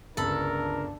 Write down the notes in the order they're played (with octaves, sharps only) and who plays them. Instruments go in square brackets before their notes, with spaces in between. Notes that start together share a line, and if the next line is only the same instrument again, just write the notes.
[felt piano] G1 C#2 [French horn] D4 [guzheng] A4 B5 [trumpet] A#4